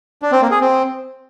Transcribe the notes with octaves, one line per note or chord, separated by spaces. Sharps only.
D4
C4
A#3
G#4
C4